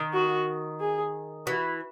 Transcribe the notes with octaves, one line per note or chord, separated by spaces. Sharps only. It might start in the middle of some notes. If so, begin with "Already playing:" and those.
Already playing: D#3
F#4
G#4
E3 F#4